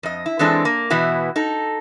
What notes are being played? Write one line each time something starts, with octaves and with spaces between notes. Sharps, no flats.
F2 D#5
E4
E3 G#3 C4 D4 A4
A#3
B2 E3 B3 E4 F#4
D#4 A4